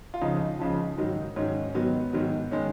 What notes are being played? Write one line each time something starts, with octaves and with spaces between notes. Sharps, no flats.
F4
C#2 C#3 F3 D#4
C#2 C#3 F3
G#2 D#3 F#3
G#2 D#3 F#3 C#4
C#4
G#2 D#3 F#3 B3
G#2 D#3 F#3
D#3 G#3 C#4